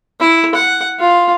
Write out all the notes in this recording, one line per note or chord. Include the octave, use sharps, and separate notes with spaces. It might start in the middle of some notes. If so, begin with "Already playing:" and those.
E4
F#5
F4